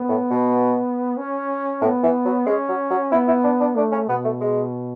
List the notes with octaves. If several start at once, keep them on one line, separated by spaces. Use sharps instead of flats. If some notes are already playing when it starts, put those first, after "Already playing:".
Already playing: B3
A2
B2
C#4
A2 B3
E3
F#3
G#3 C#4
F#3
F#3
B3 E4
E4
D4
D4
A3 D4
C#4
B2 B3
A3
G#3